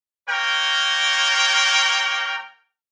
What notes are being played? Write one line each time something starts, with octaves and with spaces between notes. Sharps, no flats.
A#3 A#4 C#5 G5